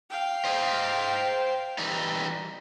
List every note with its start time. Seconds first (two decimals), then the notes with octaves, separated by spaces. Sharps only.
0.10 F5 G5
0.44 C5 D#5
1.78 E3 G3 D#4